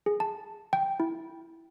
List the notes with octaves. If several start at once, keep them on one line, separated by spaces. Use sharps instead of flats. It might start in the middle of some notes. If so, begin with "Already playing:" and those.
G#4
A5
G5
E4